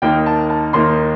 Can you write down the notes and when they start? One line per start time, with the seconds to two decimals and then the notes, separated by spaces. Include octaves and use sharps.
0.02 D#2 D#3 A#3 D#4 G5
0.26 A5
0.50 A5
0.73 D#2 D#3 A#3 D#4 C6